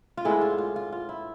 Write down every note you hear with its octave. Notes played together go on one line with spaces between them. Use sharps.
F4
A2 G#3 B3 D4 E4 G#4
F4
F4
F4
F4
E4